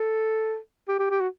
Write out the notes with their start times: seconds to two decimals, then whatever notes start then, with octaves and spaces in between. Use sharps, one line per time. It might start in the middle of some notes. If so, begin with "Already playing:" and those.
Already playing: A4
0.88 G4
0.99 G4
1.10 G4
1.21 F#4